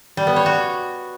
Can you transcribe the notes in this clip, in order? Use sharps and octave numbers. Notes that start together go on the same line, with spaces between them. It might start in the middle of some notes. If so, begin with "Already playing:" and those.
G3
B3
C#5
F#4